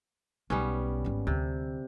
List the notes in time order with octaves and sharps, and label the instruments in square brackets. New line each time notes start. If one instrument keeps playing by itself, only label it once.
[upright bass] B1 [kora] G3 B3 C#4
[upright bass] G#1 C#4
[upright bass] D2 [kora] C3